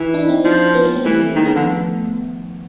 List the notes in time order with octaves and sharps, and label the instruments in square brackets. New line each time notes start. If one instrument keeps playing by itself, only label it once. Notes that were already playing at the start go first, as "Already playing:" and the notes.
Already playing: [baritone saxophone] E3
[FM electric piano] D4 E4
D#4
C4 D4
[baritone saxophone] F3
[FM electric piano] B3 C#4
A#3 C4
A#3 C4
[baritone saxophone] E3 [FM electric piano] G3 A3
[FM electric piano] G3 A3
[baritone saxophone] D#3 [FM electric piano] G#3 A#3
[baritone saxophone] C#3 [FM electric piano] A3 B3
[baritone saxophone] D3 [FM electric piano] D#3 F3